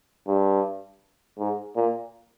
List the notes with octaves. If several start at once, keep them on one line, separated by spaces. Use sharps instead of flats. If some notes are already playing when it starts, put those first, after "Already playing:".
G2
G#2
A#2